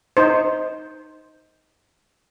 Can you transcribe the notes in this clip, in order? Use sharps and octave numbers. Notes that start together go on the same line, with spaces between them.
D#4 C5